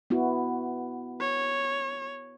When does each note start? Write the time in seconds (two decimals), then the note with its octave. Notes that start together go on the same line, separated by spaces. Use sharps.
0.10 B3 E4 F#4
1.20 C#5